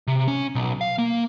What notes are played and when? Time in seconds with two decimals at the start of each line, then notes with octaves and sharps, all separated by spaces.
0.07 C3
0.28 C#4
0.55 B1
0.81 F5
0.98 A#3